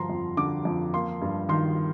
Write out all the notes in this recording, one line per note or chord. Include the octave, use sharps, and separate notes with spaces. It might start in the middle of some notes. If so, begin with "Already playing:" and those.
Already playing: G2 D3 F3 A#5 C6
F2
D3 D6
F2
A#3 C6
G2
D#3 C6